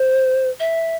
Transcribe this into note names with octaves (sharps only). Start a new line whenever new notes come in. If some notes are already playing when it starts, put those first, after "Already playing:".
Already playing: C5
E5